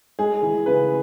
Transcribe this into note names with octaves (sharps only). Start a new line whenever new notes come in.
G#3 G#4
E3
C#3 B4